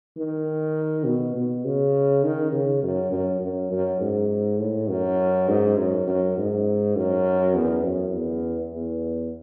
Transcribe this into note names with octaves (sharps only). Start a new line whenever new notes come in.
D#3
B2
B2
C#3
D#3
C#3
F#2
F#2
F#2
F#2
G#2
A2
F#2
G#2
F#2
F#2
G#2
F#2
E2
F#2
E2
E2